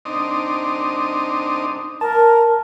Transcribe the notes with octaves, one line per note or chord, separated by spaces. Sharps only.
C4 D4 D#4
A#4 A5